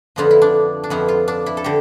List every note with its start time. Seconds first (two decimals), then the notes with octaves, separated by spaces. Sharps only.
0.16 F2 D3 F3 B3 F4
0.31 E4
0.41 D4
0.84 D4
0.90 F2 D3 F3 B3 E4
1.08 F4
1.28 D4
1.46 E4
1.57 A4
1.64 D3 G4